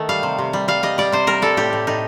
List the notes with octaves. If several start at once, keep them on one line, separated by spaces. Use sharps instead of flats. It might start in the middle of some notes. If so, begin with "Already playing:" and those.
Already playing: D#3 A3
G3 F5
C3
C3
G3
G3 F5
G3 D#5
G3 D5
C3 C5
G3 A#4
G3 A4
A2 G4
A2
A2 D#4